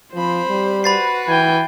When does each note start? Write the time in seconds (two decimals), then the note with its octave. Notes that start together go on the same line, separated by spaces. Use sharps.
0.14 F3 C4 C5 B5
0.49 G3
0.84 F#4 B4 B5 A6 C7
1.28 E3 G5 G#5